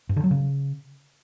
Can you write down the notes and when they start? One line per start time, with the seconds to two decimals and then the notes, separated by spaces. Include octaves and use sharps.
0.09 G2
0.16 D3
0.24 F#3
0.31 C#3